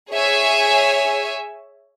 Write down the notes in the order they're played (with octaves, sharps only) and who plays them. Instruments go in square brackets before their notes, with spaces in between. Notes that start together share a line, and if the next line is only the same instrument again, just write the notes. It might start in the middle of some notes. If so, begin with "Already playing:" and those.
[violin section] G#4 C#5 E5 G#5